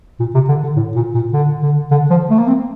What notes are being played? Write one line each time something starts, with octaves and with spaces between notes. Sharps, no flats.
A#2
C3
D3
D3
A2
A#2
A#2
D3
D3
D3
F3
A3
A#3
C4